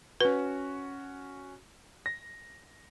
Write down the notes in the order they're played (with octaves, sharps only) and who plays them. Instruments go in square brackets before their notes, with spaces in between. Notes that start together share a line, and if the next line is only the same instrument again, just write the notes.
[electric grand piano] C#4 F#4 [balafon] B4
[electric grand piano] A#6